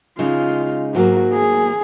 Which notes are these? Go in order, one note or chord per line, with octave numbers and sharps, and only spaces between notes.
C#3 G#3 D#4 F4
G#2 F#3 A#3 F#4
G#4